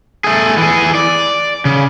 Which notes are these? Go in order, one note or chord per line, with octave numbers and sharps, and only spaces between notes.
A3 G#4
E3 G#4
D5
C#3